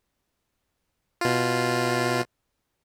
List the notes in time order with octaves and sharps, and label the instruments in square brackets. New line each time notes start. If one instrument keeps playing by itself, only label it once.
[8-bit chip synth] B2 F4